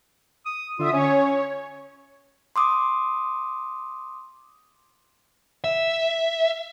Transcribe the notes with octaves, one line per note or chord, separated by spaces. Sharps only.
D#6
D3 F4 E5 D#6
C#4 C#5
C6 D6 D#6
E5